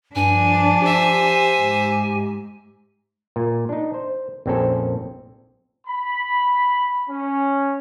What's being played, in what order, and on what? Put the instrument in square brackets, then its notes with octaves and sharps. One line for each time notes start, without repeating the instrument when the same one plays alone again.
[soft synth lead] G2 [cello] F3 D4 [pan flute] G#5
[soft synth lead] G4 [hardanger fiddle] C5 E5
[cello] G#2
[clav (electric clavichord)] A#2
D4 D#4
C5
A#1 F2 C4 C#4 A4
[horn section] B5
C#4